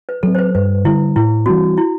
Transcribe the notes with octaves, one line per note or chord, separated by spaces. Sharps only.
B4
F#3 C4 A4
C5
B4
G2 B4
D3 G3 E4
A2 E4
E3 G3 C4 F#4
E4